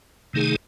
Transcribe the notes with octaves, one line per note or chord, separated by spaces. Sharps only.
C3 D#3 A3 D#4 G#4